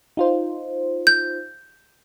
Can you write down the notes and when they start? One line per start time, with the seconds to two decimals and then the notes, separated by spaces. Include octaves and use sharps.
0.17 D#4 F4 C5
1.07 G6